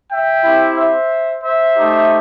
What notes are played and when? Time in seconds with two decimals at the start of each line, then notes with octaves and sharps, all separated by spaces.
0.11 E5 G5
0.44 C4 E4 G4
0.76 C5 E5
1.42 C5 E5
1.75 A3 D#4 G4